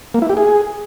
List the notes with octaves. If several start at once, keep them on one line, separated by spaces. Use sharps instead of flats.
A#3
E4
G4
G#4